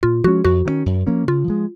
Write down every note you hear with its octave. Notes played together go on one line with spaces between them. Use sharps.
A#2 F4
F3 G#3 C#4 F#4
F2 F#4
D#3 A#3 C#4
F#2
F3 A#3 C#4
C#3 F4
F3 G#3